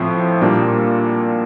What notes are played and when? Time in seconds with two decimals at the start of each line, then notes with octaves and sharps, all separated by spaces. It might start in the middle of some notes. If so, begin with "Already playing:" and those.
Already playing: A2 F3 C4 E4
0.41 A#2 G3 A#3 D4